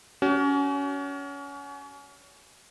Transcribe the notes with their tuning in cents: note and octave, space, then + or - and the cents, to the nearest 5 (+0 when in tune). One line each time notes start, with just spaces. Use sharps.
C#4 +25 F#4 +35